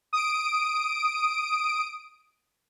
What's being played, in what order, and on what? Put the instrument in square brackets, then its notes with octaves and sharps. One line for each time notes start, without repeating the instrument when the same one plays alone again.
[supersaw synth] D#6 D7